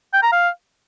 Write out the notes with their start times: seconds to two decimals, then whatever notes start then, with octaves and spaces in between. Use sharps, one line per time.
0.13 G5
0.23 A#5
0.32 F5